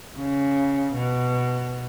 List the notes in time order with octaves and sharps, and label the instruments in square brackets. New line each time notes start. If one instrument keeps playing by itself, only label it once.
[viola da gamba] C#3
B2